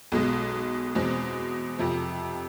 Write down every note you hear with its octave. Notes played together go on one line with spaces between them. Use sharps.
B1 B2 G#3
E2 B2 G#3 C4
F2 C3 F3